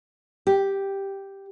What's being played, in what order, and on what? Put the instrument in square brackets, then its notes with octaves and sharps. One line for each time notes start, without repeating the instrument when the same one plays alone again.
[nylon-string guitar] G4